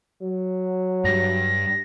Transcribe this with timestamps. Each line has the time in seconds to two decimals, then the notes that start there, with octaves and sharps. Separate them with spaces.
0.22 F#3
1.04 G2 G3 A#6